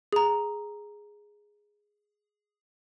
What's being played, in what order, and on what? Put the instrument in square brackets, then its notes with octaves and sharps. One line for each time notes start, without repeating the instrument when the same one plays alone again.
[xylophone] G#4 A#5